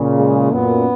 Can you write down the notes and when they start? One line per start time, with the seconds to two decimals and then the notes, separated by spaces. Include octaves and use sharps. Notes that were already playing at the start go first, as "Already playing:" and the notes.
Already playing: A#2 C#3
0.19 G#3
0.52 F#2 A#2 B3